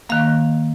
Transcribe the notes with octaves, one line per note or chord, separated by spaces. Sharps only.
D#3 A#3 F5